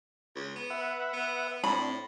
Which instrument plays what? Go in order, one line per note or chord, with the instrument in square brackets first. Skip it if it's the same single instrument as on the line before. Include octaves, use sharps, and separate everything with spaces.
[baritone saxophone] C#2
B3
[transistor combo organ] B4 E5 F#5
[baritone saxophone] B3
[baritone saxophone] A2 [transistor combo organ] C4 D4 [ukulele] B5